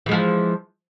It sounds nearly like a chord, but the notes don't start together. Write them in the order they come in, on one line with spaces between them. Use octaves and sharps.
E3 G#3 F3